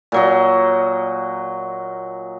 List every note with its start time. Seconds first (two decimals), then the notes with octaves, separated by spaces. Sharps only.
0.12 A#2 F#3 D#5